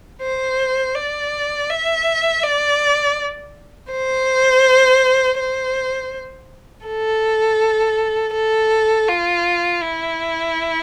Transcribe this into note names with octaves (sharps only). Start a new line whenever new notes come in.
C5
D5
E5
D5
C5
C5
A4
A4
F4
E4